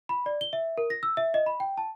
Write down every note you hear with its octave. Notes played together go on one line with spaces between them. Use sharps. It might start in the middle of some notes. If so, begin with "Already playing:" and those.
B5
D5
G7
E5
A#4
A#6
E6
E5
D#5
B5
G5
A5